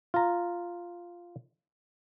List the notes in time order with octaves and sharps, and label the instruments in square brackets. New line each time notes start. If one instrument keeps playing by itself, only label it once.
[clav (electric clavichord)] F4 A#5